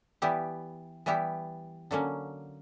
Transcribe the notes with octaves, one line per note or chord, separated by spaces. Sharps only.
E3 G3 B3 E4 G4
E3 G3 B3 E4 G4
D3 F#3 A#3 C#4